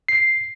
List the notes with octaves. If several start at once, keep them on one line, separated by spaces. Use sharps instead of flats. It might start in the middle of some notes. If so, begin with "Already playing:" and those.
C7